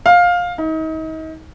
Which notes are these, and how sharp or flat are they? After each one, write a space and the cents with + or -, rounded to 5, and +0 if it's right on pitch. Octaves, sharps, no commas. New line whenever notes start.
F5 +15
D#4 +35